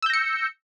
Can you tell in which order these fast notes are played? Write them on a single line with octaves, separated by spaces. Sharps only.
E6 G6 A#6 C#7